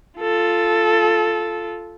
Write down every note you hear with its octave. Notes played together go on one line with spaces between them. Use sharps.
F4 A4